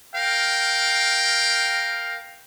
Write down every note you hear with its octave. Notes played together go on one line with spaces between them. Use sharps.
A#4 F5 G5